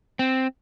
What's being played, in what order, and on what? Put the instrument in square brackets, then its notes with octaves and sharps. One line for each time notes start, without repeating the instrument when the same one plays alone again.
[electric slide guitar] C4